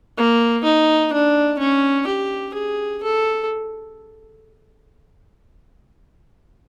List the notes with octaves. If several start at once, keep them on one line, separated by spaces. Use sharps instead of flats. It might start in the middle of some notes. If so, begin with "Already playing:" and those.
A#3
D#4
D4
C#4
G4
G#4
A4